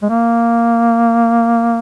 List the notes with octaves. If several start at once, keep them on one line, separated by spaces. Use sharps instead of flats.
G#3
A#3